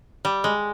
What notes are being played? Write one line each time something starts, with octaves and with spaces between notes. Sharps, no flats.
G3
G#3